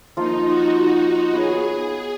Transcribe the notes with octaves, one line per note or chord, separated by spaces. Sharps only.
F3 A#3 D#4 F4
F#4
B3 F#4 G#4 C#5